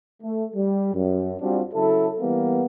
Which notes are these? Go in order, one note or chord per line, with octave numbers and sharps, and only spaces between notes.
A3
G3
F#2
G3 C4 D4 F4 F#4
C#3 F#3 E4 A4
E3 G3 A#3 B3